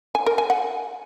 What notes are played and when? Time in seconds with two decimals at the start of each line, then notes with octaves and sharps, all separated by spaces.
0.15 G#5
0.26 A#4
0.38 G#5
0.50 F#5